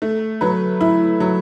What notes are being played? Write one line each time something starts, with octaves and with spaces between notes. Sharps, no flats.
A3
F#3 B4
E4
F#3